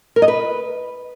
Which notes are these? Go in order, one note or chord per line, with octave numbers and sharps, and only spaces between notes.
A#4
D#5
B4